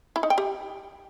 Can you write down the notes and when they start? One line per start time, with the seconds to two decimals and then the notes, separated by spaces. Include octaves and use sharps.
0.16 E4
0.23 D#4
0.30 G5
0.38 G4